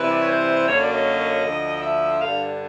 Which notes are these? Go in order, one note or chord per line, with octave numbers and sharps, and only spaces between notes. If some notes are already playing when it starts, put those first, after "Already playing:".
Already playing: C3 E3 G3 B4
D5
C#5
C5
F#2 D3 F#3 A#3 C#5
D5
D#5
D2 D3 F3
D#5
E5
G2 D3 G3 F5